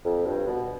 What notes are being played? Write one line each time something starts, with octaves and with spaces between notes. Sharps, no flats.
F2
G2
B2